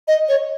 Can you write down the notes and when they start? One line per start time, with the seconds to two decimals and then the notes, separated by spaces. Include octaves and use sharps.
0.08 D#5
0.29 C#5